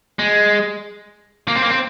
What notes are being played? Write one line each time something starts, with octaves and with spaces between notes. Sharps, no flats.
G#3
A#3
C4
A#3
C4